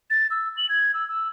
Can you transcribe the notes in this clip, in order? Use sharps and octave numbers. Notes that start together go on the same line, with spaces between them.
A6
E6
F#7
G#6
E6
E6